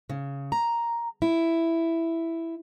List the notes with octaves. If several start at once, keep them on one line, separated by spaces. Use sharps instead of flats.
C#3
A#5
E4